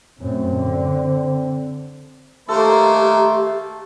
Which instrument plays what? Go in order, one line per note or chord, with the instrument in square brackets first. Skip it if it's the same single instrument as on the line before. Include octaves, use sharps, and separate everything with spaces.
[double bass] F#2 A2 [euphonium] C4
[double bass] D3
[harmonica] D#3 A#3 C5 [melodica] A3 [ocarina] G4 [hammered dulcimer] A4